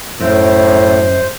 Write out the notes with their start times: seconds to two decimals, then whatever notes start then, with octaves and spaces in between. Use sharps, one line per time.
0.21 F#2 A2 C5